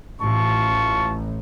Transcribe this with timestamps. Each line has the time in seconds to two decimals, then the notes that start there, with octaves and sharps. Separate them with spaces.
0.21 A1 F4 A5 C#6